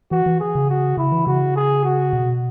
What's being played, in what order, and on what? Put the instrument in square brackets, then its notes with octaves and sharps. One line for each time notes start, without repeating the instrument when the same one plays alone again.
[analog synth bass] E3 [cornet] F#4
[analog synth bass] E3
[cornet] G#4
[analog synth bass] C#3
[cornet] F#4
[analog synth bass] C#3 [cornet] E4
[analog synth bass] E3
[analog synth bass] C#3 [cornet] F#4
[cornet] G#4
F#4
[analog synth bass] B2